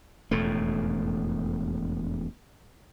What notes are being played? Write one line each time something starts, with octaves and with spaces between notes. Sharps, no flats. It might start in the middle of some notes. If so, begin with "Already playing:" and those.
E1 F2 A2 A3